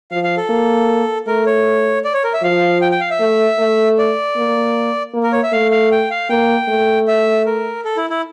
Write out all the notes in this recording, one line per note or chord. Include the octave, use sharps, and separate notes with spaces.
F3 F5
F5
A4
A#3
A3 A#4
C#5
D5
C#5
A#4
E5
F3 F5
G5
G5
F5
E5
A3
A3
D5
A#3
A#3
A#4
C#5
E5
A3 F5
F5
G5
F5
A#3 G5
A3
E5
A#4
A4
E4
E4